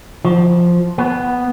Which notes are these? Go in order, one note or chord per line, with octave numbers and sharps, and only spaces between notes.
F3
B3